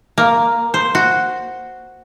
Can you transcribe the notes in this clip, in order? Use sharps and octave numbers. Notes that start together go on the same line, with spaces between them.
A#3
C5
F#4